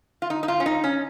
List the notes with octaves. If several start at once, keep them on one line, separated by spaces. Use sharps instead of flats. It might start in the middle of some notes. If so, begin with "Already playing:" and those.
F4
D#4
D#4
F4
C#4
D#4
C#4